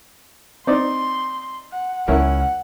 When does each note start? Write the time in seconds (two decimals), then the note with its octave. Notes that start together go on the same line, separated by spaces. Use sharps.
0.67 C4 D#4 D5 C6
1.72 F#5
2.08 C#2 C#4 E4 A#4 F#5